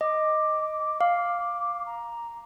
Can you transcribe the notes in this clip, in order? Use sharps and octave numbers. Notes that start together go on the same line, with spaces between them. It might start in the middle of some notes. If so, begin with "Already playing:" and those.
D#5 D6
F5
A#5